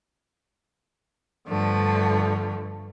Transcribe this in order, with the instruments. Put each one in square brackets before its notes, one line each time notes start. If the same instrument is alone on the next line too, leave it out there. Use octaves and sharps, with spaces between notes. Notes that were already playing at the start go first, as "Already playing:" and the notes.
[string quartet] G2 D3 F3 A3